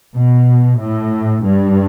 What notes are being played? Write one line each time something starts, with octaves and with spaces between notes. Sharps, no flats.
B2
A2
G2